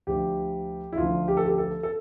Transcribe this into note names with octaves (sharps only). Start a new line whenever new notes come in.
D2 D3 F3 G4
E4
D2 D3 F3 F4
G4
A4
G4
A4
A4